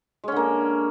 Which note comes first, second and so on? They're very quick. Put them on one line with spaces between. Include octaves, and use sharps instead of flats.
G#3 C#4 D3 A#3